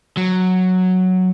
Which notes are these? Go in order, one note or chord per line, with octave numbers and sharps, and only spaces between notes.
F#3